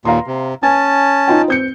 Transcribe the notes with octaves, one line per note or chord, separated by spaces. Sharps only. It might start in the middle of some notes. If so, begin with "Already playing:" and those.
D#2 A#2 F5 A#5 C6
C3
C#4 G#5 A5 A6
D#4 F4 G5
C4 G6 C#7